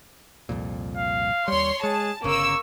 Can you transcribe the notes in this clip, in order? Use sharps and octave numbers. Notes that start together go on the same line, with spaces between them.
C2 F2 A#2
F5
D#2 G3 C#5 C6
G#3 G#4 A5
G1 C#3 A#3 C#6 E6